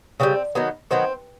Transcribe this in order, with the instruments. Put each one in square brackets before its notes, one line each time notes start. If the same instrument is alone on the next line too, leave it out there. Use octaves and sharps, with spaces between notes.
[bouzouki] C#3 E3 G3 C4
D#3 F#3 B3
D#3 F#3 B3 C4